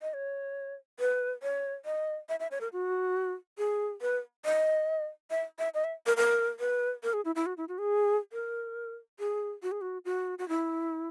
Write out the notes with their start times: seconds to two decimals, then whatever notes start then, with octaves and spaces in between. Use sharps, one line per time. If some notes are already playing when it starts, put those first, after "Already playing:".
0.02 D#5
0.14 C#5
1.00 B4
1.43 C#5
1.85 D#5
2.29 E5
2.40 E5
2.51 C#5
2.61 A#4
2.73 F#4
3.58 G#4
4.02 B4
4.45 D#5
5.31 E5
5.59 E5
5.74 D#5
5.84 E5
6.06 A#4
6.17 A#4
6.60 B4
7.03 A#4
7.13 G#4
7.25 E4
7.35 E4
7.46 F#4
7.57 E4
7.69 F#4
7.78 G#4
8.33 A#4
9.19 G#4
9.63 F#4
9.72 G#4
9.81 F#4
10.05 F#4
10.39 F#4
10.49 E4